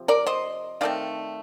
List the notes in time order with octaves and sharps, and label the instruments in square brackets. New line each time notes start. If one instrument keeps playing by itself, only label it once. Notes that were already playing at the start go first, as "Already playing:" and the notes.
Already playing: [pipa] C3 F3
A#4 D5
C5 D#5
D#3 A3 C4 D5 F5